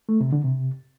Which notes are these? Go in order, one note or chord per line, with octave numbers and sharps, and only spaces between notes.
A3
C3
D3
C3